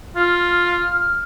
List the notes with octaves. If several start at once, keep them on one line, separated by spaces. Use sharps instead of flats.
F4 F6